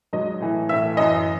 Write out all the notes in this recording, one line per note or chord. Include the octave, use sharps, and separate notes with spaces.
G#2 F#3 D#5
A2 E3
A2 E3 E5
F#2 E3 D#5